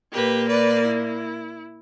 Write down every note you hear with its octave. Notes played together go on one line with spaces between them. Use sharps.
A#2 A#3 G4 B4
B4 D5
E4